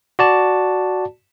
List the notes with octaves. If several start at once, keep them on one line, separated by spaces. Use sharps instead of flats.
F#4 D5 A5